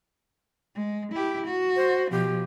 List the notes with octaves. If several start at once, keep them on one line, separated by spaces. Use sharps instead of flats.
G#3
E4 G4
F#4
C5
B2 F3 G4